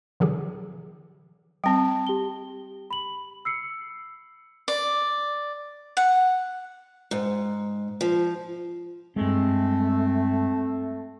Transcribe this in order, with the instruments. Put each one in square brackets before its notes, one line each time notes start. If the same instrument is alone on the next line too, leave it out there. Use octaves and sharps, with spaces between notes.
[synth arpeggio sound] B2 D3 E3 F#3 G4 G#4
[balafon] G3 C4 [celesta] G5 A5
[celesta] G4 G7
B5 F#7
E6 C7 C#7
[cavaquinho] D5
F#5
[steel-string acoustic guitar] G#2
F3
[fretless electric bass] G2 G#3 [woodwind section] A3 C4